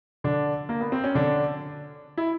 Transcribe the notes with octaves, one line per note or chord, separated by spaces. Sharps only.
D3 D4
A#3
B3
C4
C#4
D3 D4
E4